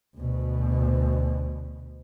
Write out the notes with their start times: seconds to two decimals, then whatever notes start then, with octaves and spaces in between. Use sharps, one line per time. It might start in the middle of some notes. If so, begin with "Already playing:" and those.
0.17 D2 B2